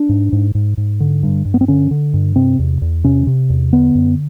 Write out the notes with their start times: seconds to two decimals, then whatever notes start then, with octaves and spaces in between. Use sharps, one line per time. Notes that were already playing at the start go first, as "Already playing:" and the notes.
Already playing: D4
0.09 G#2
0.32 G#2
0.55 G#2
0.77 G#2
1.00 D3
1.23 G2
1.45 G2
1.54 B3
1.61 C4
1.68 D3 C#4
1.91 D3
2.14 G2
2.36 C3 C4
2.59 E2
2.82 E2
3.04 C3 C#4
3.27 C3
3.50 E2
3.73 D3 B3
3.95 F#2